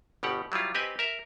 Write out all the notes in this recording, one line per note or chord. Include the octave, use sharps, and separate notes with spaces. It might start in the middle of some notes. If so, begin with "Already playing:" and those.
G1 B2 G4 F#5
F#3 G3 E4 F4
C4 G4 B4 D#5 G#5
A#4 E5